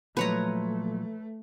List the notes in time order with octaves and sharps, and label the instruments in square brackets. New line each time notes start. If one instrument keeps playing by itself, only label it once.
[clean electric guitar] A#2 F3 F#3 [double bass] A3 [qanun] B4 C#5 A#5